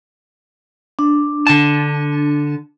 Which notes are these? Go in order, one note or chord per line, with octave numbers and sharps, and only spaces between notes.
D4
D3 A5